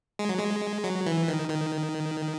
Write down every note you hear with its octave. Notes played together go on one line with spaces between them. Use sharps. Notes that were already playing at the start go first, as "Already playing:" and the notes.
G#3
F#3
G#3
F#3
E3
D#3
D#3